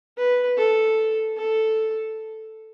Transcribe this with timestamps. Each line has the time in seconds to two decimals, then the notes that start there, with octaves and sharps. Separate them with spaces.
0.18 B4
0.58 A4
1.37 A4